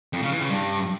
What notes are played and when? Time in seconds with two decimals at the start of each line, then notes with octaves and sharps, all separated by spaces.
0.13 F2
0.22 C#3
0.32 E3
0.41 C#3
0.50 G2